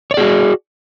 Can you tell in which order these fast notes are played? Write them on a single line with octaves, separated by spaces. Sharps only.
C#5 D5 G#4 F#4